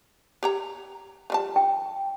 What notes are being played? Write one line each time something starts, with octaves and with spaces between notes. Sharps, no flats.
G4 C#5 A#5
F3 G3 A5
G5